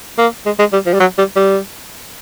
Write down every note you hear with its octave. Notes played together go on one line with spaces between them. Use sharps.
A#3
G#3
G#3
G3
F3
G3
F#3
G3
G3